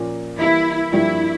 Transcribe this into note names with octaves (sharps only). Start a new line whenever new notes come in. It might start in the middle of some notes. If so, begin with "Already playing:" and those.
Already playing: A#2 F3 A#3 C#4
E3 G3 A#3 E4
G2 F3 A#3 D4 E4 G4